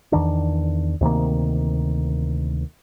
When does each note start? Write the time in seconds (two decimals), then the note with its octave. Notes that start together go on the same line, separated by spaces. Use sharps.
0.12 E2 D#3 D4
1.01 D2 C3 D#3 A#3